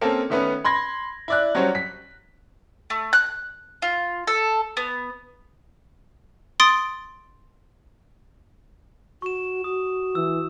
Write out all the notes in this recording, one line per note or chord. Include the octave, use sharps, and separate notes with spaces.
A#3 C4 C#4 A4
D#3 A3 B3 C#4 B4
B5 C6 G#6 A#6
E4 D5 F#6
F#3 G3 C#4 F#4 C5 C#5
B6
A3
F#6
F4
A4
B3
C6 D#6 A6 D7
F#4 C#6 E7
F#4 D#6
E3 E6